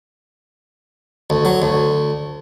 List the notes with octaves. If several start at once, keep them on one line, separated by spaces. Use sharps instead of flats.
D2
F#3
D2